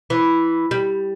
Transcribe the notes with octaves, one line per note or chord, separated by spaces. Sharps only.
E3
G3